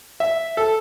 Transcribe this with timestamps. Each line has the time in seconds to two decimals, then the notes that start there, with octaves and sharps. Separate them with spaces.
0.20 E5
0.57 A4